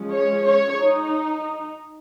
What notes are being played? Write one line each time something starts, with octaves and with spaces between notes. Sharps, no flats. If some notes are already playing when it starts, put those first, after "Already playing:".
Already playing: F3 G#3 C#4
C#5
C#5
D#4